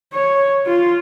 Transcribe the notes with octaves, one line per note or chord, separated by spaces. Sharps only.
C#5
F4